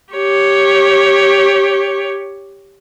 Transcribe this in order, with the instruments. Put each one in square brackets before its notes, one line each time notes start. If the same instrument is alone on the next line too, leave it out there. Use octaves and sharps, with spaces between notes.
[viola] G4 C#5